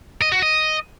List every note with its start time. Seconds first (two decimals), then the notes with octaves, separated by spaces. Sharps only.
0.22 D#5
0.32 F#4
0.42 D#5